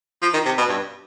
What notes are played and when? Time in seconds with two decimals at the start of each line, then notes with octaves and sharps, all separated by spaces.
0.22 F3
0.34 D#3
0.46 C3
0.58 B2
0.69 G2